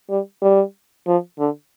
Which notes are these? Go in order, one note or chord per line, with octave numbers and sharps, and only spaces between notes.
G3
G3
F3
D3